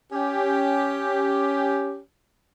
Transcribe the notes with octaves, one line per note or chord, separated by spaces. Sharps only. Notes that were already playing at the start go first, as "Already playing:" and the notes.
C#4 G4